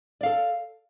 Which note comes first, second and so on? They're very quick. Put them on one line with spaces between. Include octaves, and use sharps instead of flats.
D5 F5 A4